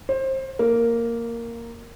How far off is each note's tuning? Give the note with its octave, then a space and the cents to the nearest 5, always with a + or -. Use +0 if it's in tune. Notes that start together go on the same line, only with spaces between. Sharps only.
C5 +25
A#3 -5